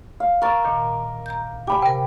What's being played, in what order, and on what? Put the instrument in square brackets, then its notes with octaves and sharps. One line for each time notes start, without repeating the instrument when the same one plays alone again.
[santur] F5
[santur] A#4 D6 E6 [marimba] C#6 A6
[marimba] A#2 D#3
A#5 G6
[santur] G4 B5 D6 [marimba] G#5
[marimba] C3 A#4 [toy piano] G5